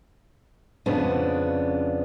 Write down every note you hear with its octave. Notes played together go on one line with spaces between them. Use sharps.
F2 C#3 B3 C#4 D4